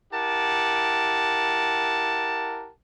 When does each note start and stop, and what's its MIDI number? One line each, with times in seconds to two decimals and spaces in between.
0.13 2.70 64
0.13 2.70 67
0.13 2.70 70
0.13 2.70 78
0.13 2.70 81